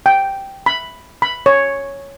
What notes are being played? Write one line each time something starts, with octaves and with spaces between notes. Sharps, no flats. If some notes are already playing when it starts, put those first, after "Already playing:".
G5
B5
B5
C#5